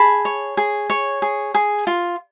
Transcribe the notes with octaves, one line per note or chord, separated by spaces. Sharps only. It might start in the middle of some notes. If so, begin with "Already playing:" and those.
Already playing: G#4 A5 B5
C#5
G#4
C#5
G#4
G#4
F4